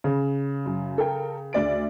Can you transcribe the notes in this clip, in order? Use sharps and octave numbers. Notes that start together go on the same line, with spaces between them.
C#3
F#2
A4 A#4 G5
D2 D5 D7